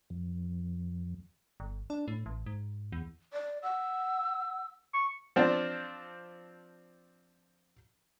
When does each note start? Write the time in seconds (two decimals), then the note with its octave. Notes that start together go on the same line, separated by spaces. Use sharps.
0.10 F2
1.60 G1
1.90 D4
2.08 A2
2.26 A1
2.46 G#2
2.92 E2
3.33 D5
3.63 F#5 E6
4.94 C#6
5.36 F3 C4 D4